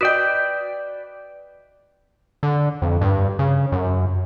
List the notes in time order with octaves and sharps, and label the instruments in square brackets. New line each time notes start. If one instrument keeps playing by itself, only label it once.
[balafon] F#4 D#5 [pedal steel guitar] B4 D5 G5
[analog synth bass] D3
F2
G2
C#3
F#2